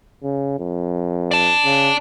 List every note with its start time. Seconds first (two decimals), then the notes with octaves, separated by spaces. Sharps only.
0.23 C#3
0.59 F2
1.31 D5 A5
1.65 C#3